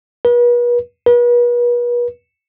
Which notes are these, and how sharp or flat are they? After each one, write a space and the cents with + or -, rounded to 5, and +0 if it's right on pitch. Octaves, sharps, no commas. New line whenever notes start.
B4 -40
B4 -40